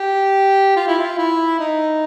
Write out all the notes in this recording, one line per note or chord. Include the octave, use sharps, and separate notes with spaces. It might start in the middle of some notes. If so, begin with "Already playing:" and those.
Already playing: G4
F4
E4
F4
E4
D#4